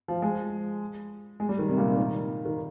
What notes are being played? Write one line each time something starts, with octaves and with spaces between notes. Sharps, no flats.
F3
G#3
G#3
G3
D#3
C3
A#2
C3
D#3
D#3